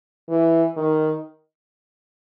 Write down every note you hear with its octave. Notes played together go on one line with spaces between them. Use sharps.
E3
D#3